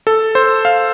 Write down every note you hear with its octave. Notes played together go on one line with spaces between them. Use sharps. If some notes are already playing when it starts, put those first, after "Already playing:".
A4
C5
F5